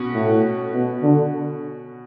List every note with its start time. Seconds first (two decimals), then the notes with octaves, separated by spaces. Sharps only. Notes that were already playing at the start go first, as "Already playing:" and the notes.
Already playing: B2 C#4 F#4
0.14 A2
0.73 B2
1.02 D3